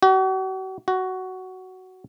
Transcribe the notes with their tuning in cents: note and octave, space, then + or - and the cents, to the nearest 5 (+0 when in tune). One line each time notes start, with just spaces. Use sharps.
F#4 +40
F#4 +10